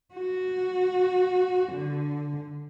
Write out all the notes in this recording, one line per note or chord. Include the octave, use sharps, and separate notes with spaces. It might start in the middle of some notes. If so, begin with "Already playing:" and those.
F#4
D3